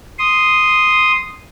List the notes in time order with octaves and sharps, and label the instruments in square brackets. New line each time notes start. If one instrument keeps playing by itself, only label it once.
[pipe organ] C6 D#6